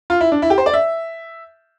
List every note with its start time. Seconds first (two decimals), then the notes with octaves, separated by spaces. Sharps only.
0.10 F4
0.21 E4
0.32 D4
0.42 E4
0.50 G4
0.58 C5
0.66 D5
0.74 E5